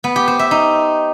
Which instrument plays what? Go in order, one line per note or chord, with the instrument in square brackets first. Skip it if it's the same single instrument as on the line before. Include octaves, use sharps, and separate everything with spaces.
[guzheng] B3
G4
C5
E5
D#4